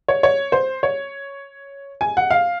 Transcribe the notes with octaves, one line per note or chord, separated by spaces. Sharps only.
C#5
C#5
C5
C#5
G#5
F#5
F5